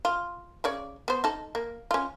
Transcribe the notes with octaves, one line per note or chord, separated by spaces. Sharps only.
F4
C#3 C#5 D5
B3 C5
D#4 A4
A#3
C#4 F4